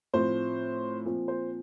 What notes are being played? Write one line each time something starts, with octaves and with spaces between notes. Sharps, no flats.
A2 F3 C4 C5
A#2 F3 C4
C5